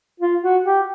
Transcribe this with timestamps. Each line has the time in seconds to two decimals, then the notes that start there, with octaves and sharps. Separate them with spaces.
0.20 F4
0.43 F#4
0.65 G4